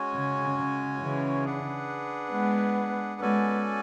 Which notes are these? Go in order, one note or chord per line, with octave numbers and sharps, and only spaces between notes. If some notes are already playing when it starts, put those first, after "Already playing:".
Already playing: G#3 C#4 F#4 C#5 G#5
C#3
C#3
C#3 E3
D4 G#4 B4 F#5
G#3 B3
G#3 B3 C#4 F#4 A4 D5 G#5